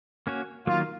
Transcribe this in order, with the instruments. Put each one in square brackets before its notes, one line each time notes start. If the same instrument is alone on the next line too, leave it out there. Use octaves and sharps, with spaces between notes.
[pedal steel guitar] A#3 C#4 F#4 C#5
[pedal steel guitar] D#3 F#3 A#3 [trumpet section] F4